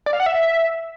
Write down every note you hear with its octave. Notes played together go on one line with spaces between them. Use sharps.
D5
F5
F#5
E5